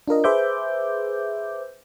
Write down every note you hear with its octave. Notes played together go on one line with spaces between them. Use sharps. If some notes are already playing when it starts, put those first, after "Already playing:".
D4 F4 A#4 D#5
G#4 B4 C5 E5 D6 G6